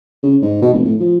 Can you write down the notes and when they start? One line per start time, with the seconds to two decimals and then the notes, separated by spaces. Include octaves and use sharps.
0.23 C#3
0.42 G#2
0.62 B2
0.73 F1
0.85 A2
1.00 F3